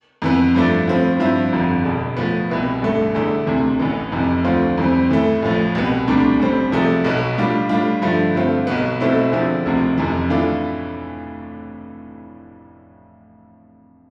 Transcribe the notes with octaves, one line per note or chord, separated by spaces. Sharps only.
F2 E3 B3
G2 F3 A3 D4
A2 F3 C4 F4
G2 F3 C4 E4
G1 F2 D3 F3
E1 E2 B2
A2 F3 B3
C2 B2 B3 E4
A1 G2 D3 A3
E2 D3 A3 E4
E1 D2 C3 E3
A1 A2 E3 B3
F1 F2 C3 E3
D2 D3 F3 C4 F4
F2 E3 G3 C4
A2 E3 A3
A1 A2 F3
C2 B2 B3
D2 C3 G3 D4
A1 A2 G3 C4
E2 C3 F3 A3
B1 B2 B3
A2 G3 D4 F4
A2 G3 D4 F4
G2 D3 F3 A3
G2 D3 A3 C4 F4
B1 B2 B3
B1 B2 A3 C4 E4
E2 D3 F3 C4 E4
E1 D2 C3 F3
F1 F2 C3 E3
A2 E3 A3 D4 F4